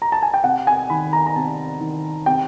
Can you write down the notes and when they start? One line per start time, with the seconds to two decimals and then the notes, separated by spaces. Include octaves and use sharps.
0.02 A#5
0.12 A5
0.22 G#5
0.34 G5
0.44 C3 F#5
0.67 G#5
0.90 D#3 B5
1.13 A#5
1.27 A#5
1.35 C3 A5
1.80 D#3
2.26 C3 G5